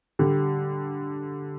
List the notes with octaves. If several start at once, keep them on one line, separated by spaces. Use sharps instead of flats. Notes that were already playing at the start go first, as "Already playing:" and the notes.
D3 G3